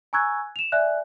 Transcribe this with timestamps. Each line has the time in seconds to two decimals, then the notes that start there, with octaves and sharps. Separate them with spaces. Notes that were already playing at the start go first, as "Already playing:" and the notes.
0.13 G#5 A#5 C#6 E6 F#6 G#6
0.56 E7 F7
0.72 D5 E5 G#5 F#6